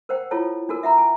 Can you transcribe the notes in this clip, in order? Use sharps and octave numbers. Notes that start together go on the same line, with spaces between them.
A#4 C5 F#5 G5
E4 F4 A4 C#5 A5
D4 F#4 A4 A#4
E5 F#5 A#5 B5
G#5